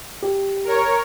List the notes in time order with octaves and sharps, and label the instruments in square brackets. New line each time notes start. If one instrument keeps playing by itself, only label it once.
[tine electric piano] G4
[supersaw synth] A#4 C#5